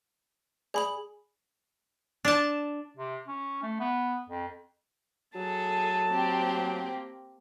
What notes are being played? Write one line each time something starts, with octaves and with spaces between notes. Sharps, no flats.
G#4 D5 G#5 B5 D#6 F#7
D4 A5
C3
C#4
A3
B3
F2
F#3 G#4 A4 A5
A#3 C4 G4